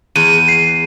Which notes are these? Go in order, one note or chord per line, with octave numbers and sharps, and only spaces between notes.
E2 D#7
C7